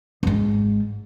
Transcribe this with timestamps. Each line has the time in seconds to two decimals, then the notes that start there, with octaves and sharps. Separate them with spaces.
0.23 G#1 G#2